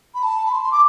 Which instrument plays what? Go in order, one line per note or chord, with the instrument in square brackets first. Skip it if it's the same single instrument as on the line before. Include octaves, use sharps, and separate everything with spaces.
[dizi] B5
A5
B5
C6
C6
D6